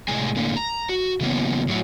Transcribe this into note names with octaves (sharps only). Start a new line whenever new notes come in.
A2 C3 G#3 G#5
A2 D3 A#3
A#5
F#4
C#3 E3 F#3 A#3 B3 C#4
A2 F#3 F#4